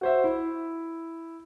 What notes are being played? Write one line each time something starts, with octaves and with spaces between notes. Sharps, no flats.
F#4 C5 E5
E4